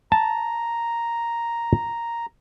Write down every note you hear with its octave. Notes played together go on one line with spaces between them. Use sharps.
A5 A#5